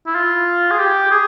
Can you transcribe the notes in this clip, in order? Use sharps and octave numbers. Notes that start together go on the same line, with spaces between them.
E4
F4
G#4
G4
G#4